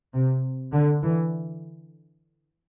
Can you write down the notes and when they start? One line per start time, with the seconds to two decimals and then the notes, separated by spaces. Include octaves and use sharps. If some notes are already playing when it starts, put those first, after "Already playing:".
0.14 C3
0.72 D3
1.02 E3